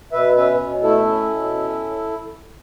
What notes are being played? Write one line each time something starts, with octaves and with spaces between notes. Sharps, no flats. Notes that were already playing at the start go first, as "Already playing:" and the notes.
B2 B4 E5
C#4 B4 E5
B2
A3 E4 A4
C#4
B2
C#4